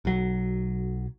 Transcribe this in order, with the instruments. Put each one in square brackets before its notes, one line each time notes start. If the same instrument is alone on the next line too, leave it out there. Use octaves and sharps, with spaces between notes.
[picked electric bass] B1 F#3